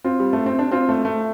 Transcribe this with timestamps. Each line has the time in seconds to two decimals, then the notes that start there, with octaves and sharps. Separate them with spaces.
0.04 C4 F4
0.20 G3
0.33 A3
0.46 C4
0.59 D4
0.72 C4 F4
0.89 A3
1.05 A3